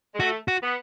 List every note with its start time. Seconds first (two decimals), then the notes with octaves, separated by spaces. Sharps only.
0.14 G#3
0.20 A3 F#4
0.48 F#4
0.63 B3